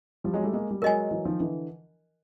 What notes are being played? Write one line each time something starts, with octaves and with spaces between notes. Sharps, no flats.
F3 G3
F#3 G#3
G3 A3
G#3 A#3
G3
F#3 G#3 A#4 D#5 G#5
E3 F#3
D#3 F3
D3 E3